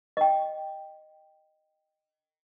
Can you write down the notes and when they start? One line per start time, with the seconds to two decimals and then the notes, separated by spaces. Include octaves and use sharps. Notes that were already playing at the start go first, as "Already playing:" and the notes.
0.17 D#5 G5